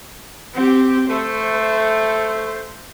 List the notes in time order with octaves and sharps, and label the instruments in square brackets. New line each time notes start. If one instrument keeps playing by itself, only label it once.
[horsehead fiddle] C4 G4
[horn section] A3 [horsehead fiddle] C5